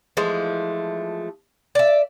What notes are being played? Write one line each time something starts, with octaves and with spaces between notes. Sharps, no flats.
E3 F3 G#3 A3
D5 E5